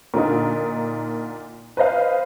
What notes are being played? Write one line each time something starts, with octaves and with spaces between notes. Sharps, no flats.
A#2 D3 A#3 D#4
B4 C5 D#5 F5